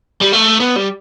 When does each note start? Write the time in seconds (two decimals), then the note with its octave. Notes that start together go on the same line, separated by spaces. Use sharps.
0.22 G3
0.33 A3
0.60 B3
0.76 G3